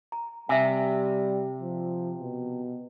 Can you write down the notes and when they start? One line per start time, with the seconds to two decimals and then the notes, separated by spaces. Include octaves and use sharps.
0.12 A#5
0.49 C3 G3 E5 G#5
1.61 F3
2.19 B2